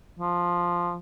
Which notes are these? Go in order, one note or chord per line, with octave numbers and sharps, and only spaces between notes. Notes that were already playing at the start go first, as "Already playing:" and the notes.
F3